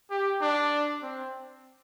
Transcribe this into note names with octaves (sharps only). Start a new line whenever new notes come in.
G4
D4
C4